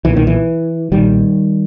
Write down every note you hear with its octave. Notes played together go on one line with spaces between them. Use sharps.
B1 A#2 E3
D#3
E3
B1 A#2 D#3 G3